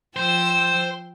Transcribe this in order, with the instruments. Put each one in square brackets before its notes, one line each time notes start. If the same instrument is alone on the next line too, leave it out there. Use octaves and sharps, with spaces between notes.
[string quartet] F3 G5 E6 [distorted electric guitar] C5